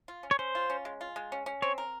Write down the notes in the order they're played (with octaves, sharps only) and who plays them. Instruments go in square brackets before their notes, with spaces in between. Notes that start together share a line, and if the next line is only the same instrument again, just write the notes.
[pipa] F4
C#4
[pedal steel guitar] C#5
[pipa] C#4 [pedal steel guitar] C5
[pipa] F4
C#4
G#3
F4
G#3
C#4
C#4
[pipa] C4 [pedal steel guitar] C#5
[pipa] A#4